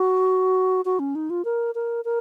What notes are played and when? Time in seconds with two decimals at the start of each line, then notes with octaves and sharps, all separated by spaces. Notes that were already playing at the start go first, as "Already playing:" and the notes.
Already playing: F#4
0.85 F#4
0.99 C#4
1.15 D#4
1.30 F4
1.45 A#4
1.75 A#4
2.05 A#4